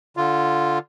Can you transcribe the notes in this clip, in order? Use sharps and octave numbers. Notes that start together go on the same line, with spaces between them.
D3 F4